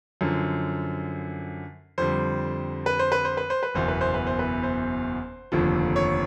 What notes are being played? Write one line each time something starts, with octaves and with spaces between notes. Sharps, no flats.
F#2 D3 F3
F2 D3 G3 C5
B4
C5
B4
C5
B4
C5
B4
F#1 E2 B2 C5
B4
C5
B4
C5
B4
C5
F1 D#2 D3 F3
C#5